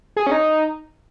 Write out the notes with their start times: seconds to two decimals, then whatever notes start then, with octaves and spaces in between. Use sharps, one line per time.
0.16 G#4
0.27 C#4
0.31 D#4